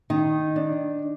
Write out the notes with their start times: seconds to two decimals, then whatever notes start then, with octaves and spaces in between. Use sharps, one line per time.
0.10 D#3 D#4
0.56 D4